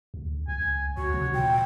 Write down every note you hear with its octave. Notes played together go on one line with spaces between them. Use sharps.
D2
C#2 G#5
D2 F#4 C#5
C3
A#2 G5